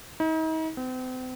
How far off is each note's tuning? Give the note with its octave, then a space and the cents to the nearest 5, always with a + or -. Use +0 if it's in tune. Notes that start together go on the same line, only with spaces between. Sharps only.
D#4 +40
C4 -40